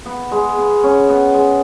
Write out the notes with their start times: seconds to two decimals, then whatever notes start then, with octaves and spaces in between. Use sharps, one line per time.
0.06 B3
0.31 G#3
0.58 B3
0.84 C#4
1.09 B3
1.34 G#3